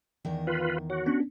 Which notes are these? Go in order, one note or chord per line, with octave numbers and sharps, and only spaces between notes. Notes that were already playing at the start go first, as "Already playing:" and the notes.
E2 D#3 A#4
F4 B4
F#4 C#5
B3 C#4 D4